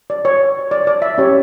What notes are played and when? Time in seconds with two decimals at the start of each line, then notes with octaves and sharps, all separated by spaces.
0.10 D5
0.25 C#5
0.71 D5
0.87 D5
1.02 E5
1.18 C#4 G4 C#5